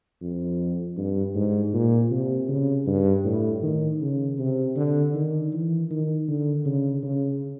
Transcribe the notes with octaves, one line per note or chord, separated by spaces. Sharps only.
F2
G2
G#2
A#2
C3
C#3
G2
A2
D#3
C#3
C3
D3
D#3
E3
D#3
D3
C#3
C#3